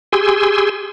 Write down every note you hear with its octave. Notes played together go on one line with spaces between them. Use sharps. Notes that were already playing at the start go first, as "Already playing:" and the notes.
G4 G#4 G#5 C6 E6